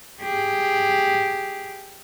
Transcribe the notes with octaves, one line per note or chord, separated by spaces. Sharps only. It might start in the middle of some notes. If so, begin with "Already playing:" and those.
G4 G#4